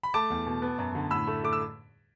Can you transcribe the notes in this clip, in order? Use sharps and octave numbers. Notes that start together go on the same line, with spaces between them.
B5
A3 A5 D6
E2
B2
B3
F#2
D3
A2 B5 E6
A3
A3 D6
E6